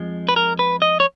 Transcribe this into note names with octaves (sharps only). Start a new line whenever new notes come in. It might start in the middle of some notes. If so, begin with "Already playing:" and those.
Already playing: F2 F3 G#3
B4
A#4
B4
D#5
C#5